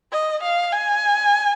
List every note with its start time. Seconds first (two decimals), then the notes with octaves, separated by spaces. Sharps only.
0.13 D#5
0.43 F5
0.73 G#5